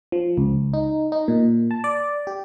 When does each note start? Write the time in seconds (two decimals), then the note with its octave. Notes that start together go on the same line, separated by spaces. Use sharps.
0.12 F3
0.37 C#2
0.74 D#4
1.12 D#4
1.28 A#2
1.71 A5
1.84 D5
2.27 G4